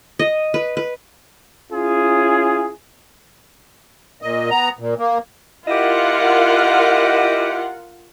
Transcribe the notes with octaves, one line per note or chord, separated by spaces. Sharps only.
D#5
B4
B4
C#4 E4 F4 G#4
A#2 D#5
B3 A#5
A#2
A#3
E4 F4 G4 A#4 D#5 F#5